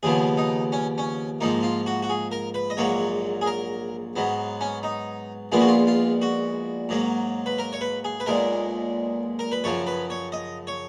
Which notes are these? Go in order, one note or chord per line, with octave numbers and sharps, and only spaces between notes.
D#2 C#3 F3 B3 G#4
D#4
C#4
C#4
G#2 F3 A#3 D#4
F4
F#4
F#4
G#4
A#4
B4
D#5
A#1 G#2 F#3 A#3 C#5
G#4
A#4
G#2 F#3 B3
C#4
D#4
A#1 A#2 G#3 B3 F4
F#4
F4
F4
F#4
G#2 F#3 A#3
B4
A#4
C#5
B4
G#4
B4
B1 A#2 G#3 A#4
A#4
B4
F#2 C#3 F3 C#5
B4
C#5
D#5
C#5